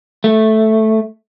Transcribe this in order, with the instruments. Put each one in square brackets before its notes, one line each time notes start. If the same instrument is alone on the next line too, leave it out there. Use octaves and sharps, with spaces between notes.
[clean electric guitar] A3